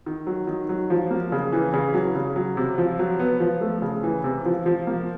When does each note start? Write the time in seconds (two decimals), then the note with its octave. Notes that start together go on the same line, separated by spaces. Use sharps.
0.06 D#3
0.27 F#3
0.47 D#3
0.69 F#3
0.90 F3
1.11 A#3
1.32 C#3
1.52 E3
1.74 C#3
1.94 F#3
2.15 C#3
2.36 F#3
2.57 C3
2.78 F3
2.99 F#3
3.20 B3
3.40 F3
3.61 A3
3.82 C#3
4.03 E3
4.24 C3
4.45 F3
4.66 F3
4.87 A#3